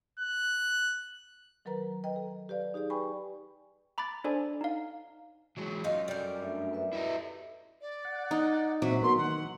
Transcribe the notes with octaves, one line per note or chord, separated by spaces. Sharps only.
F#6
D#3 F#3 A#4 B4 A#5
B4 D#5 G5 A#5
A4
G4 B4 D5 F5
D#4 G4 G#4 D5
B4 G5 G#5 B5 C#6
A#5 B5 D6 F#6 A6
D4 A4 C5 D5 G#5 A#5
D#4 F5
E3 F#3 G#3
F#2 D#4 F4
G3 A4 A#4
A3 D4 E5
A4 B4 E5
E4 F#4 D#5
D5
F#5
D#4
A#2 F#3 C4 E5
A#3 B3 F#4 C6
D#3 F#5